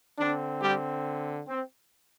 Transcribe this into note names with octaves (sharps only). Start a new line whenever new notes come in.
D3 C4 D4
G3 G4
C4